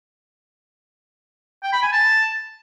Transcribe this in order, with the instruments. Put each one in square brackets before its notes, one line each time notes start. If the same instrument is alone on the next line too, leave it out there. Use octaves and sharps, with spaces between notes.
[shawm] G5
B5
G#5
A5